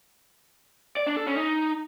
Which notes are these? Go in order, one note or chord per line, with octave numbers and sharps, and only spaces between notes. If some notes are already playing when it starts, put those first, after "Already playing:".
D5
D4
A4
C#4
D#4